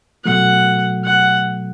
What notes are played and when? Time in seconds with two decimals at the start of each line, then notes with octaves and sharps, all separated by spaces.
0.25 B2 F#3 A3 F#5
1.05 F#5